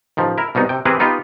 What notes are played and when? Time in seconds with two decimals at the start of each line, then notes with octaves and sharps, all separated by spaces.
0.17 A1 D#3 F3
0.38 E4 A#4
0.55 C2 B2 B3 D#4
0.69 C3 G5
0.85 E3 C4 G4 G#4 A#4 B4
1.00 B3 D#4 F4 G4 B4